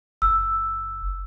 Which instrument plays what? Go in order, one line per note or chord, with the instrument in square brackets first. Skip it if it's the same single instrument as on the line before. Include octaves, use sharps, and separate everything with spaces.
[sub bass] F#1 [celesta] E6